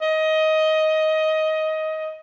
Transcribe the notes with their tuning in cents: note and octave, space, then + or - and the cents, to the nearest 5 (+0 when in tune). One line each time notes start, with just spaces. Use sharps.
D#5 +15